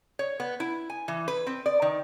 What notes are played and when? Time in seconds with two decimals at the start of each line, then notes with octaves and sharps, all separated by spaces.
0.19 C#5
0.40 B3
0.60 E4
0.90 G#5
1.08 E3
1.28 B4
1.47 C4
1.66 D5
1.82 D#3